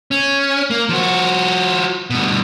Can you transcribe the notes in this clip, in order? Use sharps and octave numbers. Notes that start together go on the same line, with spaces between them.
C#4
A#3
F3 F#4
G2 B2